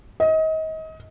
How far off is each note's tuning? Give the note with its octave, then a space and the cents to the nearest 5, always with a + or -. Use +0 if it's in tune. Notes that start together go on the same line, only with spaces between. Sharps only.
D#5 +30